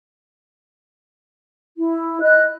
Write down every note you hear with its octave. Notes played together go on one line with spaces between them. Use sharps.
E4
D#5 F#6